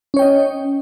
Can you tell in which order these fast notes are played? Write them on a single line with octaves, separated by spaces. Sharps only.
C#4 C#5 G5 D#5